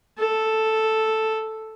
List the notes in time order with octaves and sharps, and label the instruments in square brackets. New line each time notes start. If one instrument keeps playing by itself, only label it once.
[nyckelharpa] A4